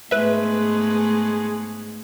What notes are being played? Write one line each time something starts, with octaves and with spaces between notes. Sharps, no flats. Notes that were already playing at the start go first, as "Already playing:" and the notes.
G#2 G#3 A3 B3 B4 E5